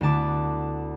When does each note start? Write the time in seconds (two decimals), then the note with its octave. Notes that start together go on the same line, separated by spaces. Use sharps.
0.01 D2 D3 B3 E4 A5 D6